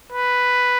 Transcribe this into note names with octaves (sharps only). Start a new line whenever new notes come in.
B4